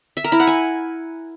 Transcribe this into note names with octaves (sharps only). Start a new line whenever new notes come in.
E5
A#4
E4
F#5
G#5